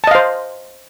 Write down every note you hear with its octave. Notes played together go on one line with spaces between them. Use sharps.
C5 D#5 F5 A5